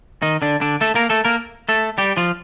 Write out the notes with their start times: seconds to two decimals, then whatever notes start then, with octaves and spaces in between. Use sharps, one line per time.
0.22 D#3 D#4
0.42 D3 D4
0.61 D3 D4
0.81 A3 A4
0.95 A#3 A#4
1.10 A3 A4
1.25 A#3 A#4
1.69 A3 A4
1.98 G3 G4
2.17 F3 F4